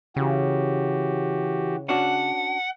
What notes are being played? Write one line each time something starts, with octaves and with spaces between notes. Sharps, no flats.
C#3 E3 F#4 G4
C#4 D4 F#4 F#5